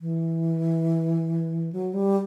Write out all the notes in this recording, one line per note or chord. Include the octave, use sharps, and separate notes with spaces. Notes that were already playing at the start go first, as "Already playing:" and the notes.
E3
F#3
G3